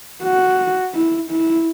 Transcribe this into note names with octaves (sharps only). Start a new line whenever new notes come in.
F#4
E4
E4